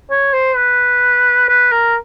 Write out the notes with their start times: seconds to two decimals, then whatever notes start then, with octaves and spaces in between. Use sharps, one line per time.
0.10 C#5
0.33 C5
0.56 B4
1.49 B4
1.72 A#4